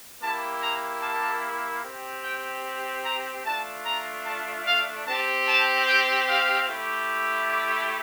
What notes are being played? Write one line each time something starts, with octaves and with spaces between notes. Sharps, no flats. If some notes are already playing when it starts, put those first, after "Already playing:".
A#3 E4 G4 A5
A#5
A5
C4 G4
G5
A#5
A3 D4 F4 A5
A#5
A5
F5
C4 G4 A5
A5
G5
F5
A3 E4 G4
D5